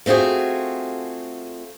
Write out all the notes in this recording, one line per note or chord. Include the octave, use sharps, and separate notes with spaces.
A3 C4 F4 F#4 G#4